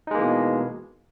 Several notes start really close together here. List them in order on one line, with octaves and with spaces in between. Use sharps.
D#4 G#3 A#3 E3 B2